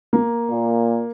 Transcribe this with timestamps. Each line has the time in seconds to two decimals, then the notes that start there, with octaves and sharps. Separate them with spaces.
0.13 A#3
0.50 A#2